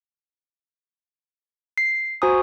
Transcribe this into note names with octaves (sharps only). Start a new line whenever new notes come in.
C7
F#4 C5 G#5 A#5 D#6